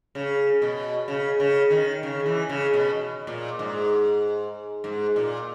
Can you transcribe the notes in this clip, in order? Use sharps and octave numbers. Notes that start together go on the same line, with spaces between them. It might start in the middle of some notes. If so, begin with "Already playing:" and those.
C#3
B2
C#3
C#3
D#3
C#3
E3
C#3
B2
A#2
G#2
G#2
A#2